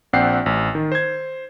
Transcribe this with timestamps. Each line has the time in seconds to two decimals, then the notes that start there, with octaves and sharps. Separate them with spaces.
0.13 A#1 C4 D5 F#5 G5 C7
0.46 A1
0.75 D#3
0.92 C5 G#6